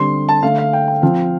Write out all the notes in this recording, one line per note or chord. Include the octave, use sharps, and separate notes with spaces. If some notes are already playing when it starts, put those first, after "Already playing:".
Already playing: D3 G3 C4 C6
A5
D3 A3 D4 F5
F5
G5
G5
F3 C4 F4